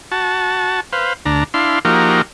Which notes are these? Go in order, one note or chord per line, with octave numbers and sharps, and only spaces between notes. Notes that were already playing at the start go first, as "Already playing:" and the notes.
F#4 A5
B4 C5 F5
D2 D4 A#5
D4 E4 F5 C6
F3 A#3 D#4 F#4 G4 A#4